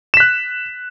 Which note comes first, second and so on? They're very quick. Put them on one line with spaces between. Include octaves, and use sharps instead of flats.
E7 B6 F#6